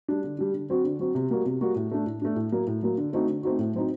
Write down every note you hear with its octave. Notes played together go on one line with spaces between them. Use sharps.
G3 D4
D3
G3 D4
D3
F#3 C4 F#4
D3
F#3 C4 F#4
C3
G3 A#3 F#4
C3
G3 A#3 F#4
A2
A3 D4
A2
A3 D4
A2
F#3 A#3
A2
F#3 A#3
D3
A3 C4 D#4 F#4
D3
A3 C4 D#4 F#4
A2
F#3 C4 D#4